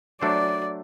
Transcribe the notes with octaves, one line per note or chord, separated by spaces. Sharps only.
F#3 A3 D4 A4 C5 D5